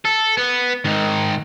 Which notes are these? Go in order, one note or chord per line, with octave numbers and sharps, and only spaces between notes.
A4
B3
G#2 D#3